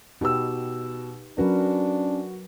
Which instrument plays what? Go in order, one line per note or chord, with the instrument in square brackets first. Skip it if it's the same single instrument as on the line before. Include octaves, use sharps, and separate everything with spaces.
[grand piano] B2 E6 [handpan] D#4 G4 B4
[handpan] F#3 A#4 B4 [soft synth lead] C#4 [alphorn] D4 [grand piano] F#4